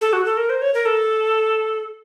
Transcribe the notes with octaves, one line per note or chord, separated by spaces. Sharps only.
A4
F#4
A4
A#4
C5
C#5
A#4
A4